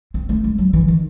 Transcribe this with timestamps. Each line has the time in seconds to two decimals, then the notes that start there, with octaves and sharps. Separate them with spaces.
0.14 C4
0.29 A3
0.44 G#3
0.58 F#3
0.73 E3
0.88 D#3